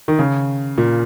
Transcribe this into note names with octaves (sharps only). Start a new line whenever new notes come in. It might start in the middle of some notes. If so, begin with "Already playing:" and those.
D#3
C#3
A#2